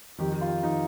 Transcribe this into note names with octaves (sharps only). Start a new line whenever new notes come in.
F2 D#3 G4
G4
F4
D#3 D#4